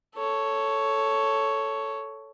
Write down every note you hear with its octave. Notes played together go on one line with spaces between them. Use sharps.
A4 C#5